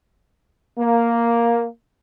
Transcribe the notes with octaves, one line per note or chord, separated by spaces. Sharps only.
A#3